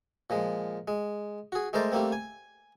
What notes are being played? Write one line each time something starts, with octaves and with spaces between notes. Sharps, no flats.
A#2 F3 G#3
G#3
F#4 G#4
G#3 A3 A#4 C5 D5
G3 A3 A#3 C4
G#5